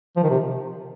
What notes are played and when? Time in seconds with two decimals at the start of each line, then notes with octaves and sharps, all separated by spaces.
0.16 F3
0.23 D#3
0.30 C3